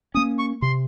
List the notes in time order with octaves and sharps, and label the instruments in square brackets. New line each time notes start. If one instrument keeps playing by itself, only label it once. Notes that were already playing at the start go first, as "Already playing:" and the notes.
[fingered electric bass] A#3 C#4 [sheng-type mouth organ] D#6
[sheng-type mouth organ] C#6
[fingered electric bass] C3 [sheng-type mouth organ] C6